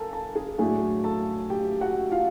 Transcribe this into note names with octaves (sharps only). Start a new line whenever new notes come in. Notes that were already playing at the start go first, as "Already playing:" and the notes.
Already playing: A4 A#4 G#5 A5
A4 A5
G#4 G#5
A2 F#3 A3 D4 G#4 G#5
A4 A5
G4 G5
F#4 F#5
F4 F5